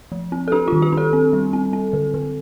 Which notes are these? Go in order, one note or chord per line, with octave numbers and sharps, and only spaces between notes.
F3
C4
A4
D4 G4
D#3 F4
G4
D4
A4
C4
G3
C4
C4
D3
D3